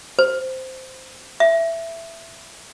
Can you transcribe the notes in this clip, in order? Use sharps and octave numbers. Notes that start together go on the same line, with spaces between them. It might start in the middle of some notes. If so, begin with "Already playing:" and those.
C5
E5